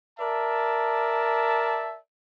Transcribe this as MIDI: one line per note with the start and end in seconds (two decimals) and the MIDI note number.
0.19 1.97 70
0.19 1.97 74
0.19 1.97 76
0.19 1.97 81